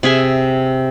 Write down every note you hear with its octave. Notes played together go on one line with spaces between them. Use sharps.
C3 G#4 E5 G#5